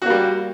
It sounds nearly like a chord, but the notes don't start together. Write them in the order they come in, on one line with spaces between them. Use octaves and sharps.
F#4 A#3 G3